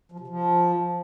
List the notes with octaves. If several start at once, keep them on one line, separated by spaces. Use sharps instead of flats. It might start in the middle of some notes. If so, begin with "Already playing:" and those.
F3
C3
F3